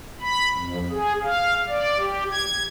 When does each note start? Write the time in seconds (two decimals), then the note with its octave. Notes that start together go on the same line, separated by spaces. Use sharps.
0.21 B5
0.58 F2
0.91 G#4
1.23 F5
1.68 D5
1.98 G4
2.30 G#6